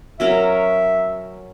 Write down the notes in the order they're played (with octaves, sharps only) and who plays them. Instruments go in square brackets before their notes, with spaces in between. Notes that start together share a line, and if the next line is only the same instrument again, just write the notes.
[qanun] F#3 C#4 A#4 [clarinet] E5